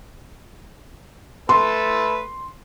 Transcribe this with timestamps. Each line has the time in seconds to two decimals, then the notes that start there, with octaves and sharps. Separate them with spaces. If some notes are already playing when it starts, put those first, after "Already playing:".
1.49 A3 A4 B4 C6